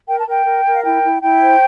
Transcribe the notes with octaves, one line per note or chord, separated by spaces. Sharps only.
A#4 G5
A5
A#4 G5
A#4
A#4
F5
E4 G5
E4
E4 G5
C5